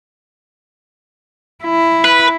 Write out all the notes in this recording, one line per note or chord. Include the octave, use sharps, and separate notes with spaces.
E4
B4